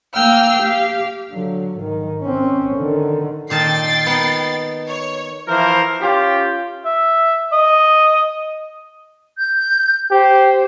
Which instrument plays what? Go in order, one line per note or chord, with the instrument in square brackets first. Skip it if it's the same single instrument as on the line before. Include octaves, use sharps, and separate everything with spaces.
[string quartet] A#3 F5 G5 E6 F6
G4 F5
[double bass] D3 F#3
G#2 D#3
C4 C#4
D3 D#3
[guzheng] A#2 D#3 A5 [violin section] G5 A6 C7
[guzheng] B3 D#4
[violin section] C#5
[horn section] E3 F3 E4 A#4 C5
C#4 F4 G4
[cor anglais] E5
D#5
[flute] G6
[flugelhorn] G4 [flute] C5